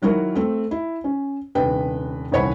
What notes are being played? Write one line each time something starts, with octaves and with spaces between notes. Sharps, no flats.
D#3 F#3 E4 F#4 A#4
A3 C4
E4
C#4
D#1 C3 D4 B4 G5
D#1 C2 E3 C#5 F#5 B5